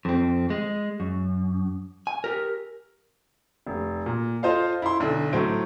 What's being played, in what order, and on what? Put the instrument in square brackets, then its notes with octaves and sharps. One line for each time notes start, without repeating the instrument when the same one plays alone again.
[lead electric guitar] F2 C4
G#3
F#2
G#5
G4 A#4
[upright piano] F1
A#2
F4 A4 C5 D#5 F5
E4 C6
B1 D3
A2 F#3 A3 C5 D7